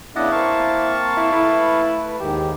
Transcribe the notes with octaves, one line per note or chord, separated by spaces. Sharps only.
C#3 B3 D4 E4 D5 D#5 F#5
A#3 C4 F5 A5 C#6
E4
A3 E4 B4
D#2 G#2 D#3 G4